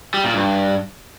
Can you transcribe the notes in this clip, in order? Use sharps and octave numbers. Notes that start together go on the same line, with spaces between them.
G3
A#2
G2